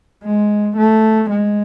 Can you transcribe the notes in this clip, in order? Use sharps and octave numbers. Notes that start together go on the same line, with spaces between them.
G#3
A3
G#3